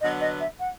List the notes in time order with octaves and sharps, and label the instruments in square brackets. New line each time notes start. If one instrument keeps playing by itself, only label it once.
[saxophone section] D3 F#3 B3 [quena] D#5
[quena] D#5
E5
F#5